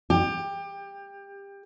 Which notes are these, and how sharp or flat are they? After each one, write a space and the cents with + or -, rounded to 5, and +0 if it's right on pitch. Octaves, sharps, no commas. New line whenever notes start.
G4 +25